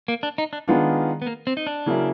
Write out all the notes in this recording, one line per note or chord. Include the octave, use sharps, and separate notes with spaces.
A#3
D4
D#4
D4
D#3 G#3 B3 D4 F4
B3
A#3
C4
D#4
D4
C#3 F#3 A#3 C#4 E4